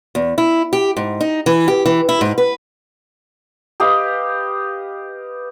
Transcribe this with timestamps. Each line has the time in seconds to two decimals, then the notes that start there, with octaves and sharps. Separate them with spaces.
0.15 E2
0.38 E4
0.73 G4
0.97 G#2
1.21 D#4
1.46 E3
1.68 G4
1.86 E3
2.09 E4
2.21 G#2
2.38 B4
3.80 G4 B4 D#5 F5